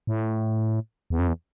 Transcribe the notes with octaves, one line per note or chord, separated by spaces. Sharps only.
A2
E2
F2
E2